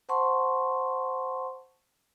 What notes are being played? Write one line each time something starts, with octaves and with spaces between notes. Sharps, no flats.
C5 F#5 A5 C6 C#6